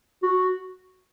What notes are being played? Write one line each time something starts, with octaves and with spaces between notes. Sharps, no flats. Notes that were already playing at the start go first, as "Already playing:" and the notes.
F#4